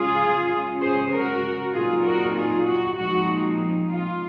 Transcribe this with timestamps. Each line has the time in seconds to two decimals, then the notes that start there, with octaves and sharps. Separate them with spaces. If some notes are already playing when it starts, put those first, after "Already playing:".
Already playing: C#3 G#3 C#4 F4 G#4
0.50 C#3 G#3 C#4
0.81 G#4 C5
1.12 F#4 A#4
1.74 A#2 F#3 C4 D#4 F4 G#4
2.04 F#4 A#4
2.35 F4 G#4
2.66 F#4
2.97 A#2 F3 G#3 C4 D#4 F#4
3.90 F4